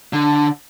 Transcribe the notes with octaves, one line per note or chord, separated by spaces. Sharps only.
D3